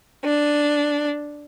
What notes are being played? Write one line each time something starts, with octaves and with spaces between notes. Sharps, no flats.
D4